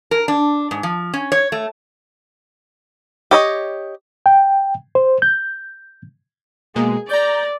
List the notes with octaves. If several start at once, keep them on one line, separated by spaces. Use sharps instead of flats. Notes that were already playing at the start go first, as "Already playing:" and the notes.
A#4
D4
G#2
F3
C#4
C#5
A3
G4 C#5 D#5
G5
C5
G6
B2 G#3 A#3 G#4
D5 A#5 G6